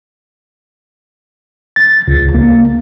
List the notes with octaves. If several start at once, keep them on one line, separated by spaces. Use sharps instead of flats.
A6
C#2
A#3